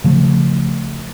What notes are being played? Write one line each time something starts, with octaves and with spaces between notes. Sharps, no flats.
C#3 F3 A3